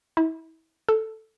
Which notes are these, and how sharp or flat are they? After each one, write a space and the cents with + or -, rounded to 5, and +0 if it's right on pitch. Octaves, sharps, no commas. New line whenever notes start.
E4 -35
A4 +0